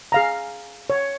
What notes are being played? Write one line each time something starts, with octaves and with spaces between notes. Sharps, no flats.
G#4 F5 A#5
C#5